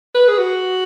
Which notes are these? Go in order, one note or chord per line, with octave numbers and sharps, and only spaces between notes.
B4
G#4
F#4